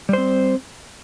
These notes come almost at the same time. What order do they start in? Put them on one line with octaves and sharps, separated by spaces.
G3 C5 C4